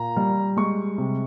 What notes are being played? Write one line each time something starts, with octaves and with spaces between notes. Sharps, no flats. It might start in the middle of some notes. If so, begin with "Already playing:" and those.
Already playing: A#2 A#5
G3
G#3 C#6
C3